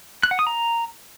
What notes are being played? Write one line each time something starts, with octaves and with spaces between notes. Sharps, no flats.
F#6
F#5
D#6
A#5